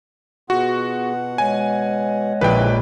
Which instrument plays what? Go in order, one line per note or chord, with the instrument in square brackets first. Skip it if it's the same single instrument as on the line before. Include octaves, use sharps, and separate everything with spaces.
[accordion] B2 F#5 [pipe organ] B3 F4 G#4 [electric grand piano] F#4
[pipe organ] G#3 C#5 D#5 [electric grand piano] G#5
[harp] A#1 [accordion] F2 A#2 E4 [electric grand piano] B4 G5